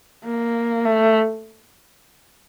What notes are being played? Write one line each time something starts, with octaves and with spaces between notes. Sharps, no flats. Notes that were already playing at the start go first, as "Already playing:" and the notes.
A#3
A3